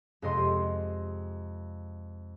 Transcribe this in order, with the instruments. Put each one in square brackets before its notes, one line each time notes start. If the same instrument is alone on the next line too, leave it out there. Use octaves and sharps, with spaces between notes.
[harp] F2 C3 G#3 D#5 C6